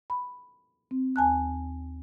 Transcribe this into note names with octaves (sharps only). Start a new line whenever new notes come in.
B5
C4
D#2 G#5 A5 F#6